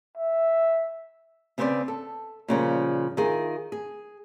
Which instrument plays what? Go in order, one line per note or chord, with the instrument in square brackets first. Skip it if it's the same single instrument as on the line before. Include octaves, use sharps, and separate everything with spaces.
[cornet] E5
[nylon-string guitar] C#3 B3 C4 B4 C5 D5
A4
A#2 C#3 F3 G3
D#3 E4 F4 G#4
G#4